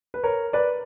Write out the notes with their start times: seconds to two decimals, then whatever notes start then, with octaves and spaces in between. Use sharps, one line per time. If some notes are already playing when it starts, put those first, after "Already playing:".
0.14 B4
0.23 A#4 C#5
0.53 B4 D5